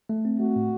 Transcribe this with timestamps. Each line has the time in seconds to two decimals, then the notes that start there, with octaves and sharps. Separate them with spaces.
0.09 A3
0.25 C4
0.40 A3 F#4
0.56 A2